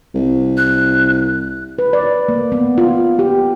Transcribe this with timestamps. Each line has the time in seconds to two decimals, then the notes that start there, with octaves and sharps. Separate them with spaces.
0.15 C2
0.57 F#6
1.79 B4
1.93 D5
2.29 A#3
2.52 B3
2.78 F4
3.19 G4